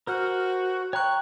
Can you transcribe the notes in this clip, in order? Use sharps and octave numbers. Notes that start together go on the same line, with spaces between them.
F#4 A#4 C5 F6
C#5 G5 A#5 C#6 F#6